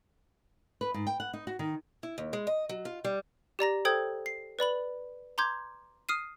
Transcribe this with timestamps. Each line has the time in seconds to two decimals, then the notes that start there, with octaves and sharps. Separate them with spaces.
0.81 B4
0.94 G#2
1.07 G5
1.20 F#5
1.33 D#4
1.47 F#4
1.59 D#3
2.03 E4
2.18 D#2
2.33 G#3
2.47 D#5
2.69 F#3
2.85 F4
3.05 G3
3.59 G4 D5 A#5 A#6
3.85 A4 C5 G5 D#6 G#6
4.26 C7
4.59 B4 D5 B5 F#7
5.38 A#5 C6 D6 G6 G#6
6.09 D#6 F6 C7 D#7